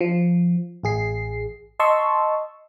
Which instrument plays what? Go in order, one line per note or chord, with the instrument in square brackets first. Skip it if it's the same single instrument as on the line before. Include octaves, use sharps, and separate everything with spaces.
[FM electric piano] F3
A1 G#4 C7
D#5 A5 C6 C#6 E6